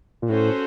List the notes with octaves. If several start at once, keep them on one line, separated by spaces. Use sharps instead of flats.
A#2
A2 C#4 F#4 A4 C5